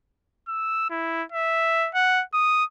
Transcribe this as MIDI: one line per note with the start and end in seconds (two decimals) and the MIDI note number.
0.48 0.90 88
0.90 1.23 64
1.32 1.89 76
1.94 2.22 78
2.34 2.64 87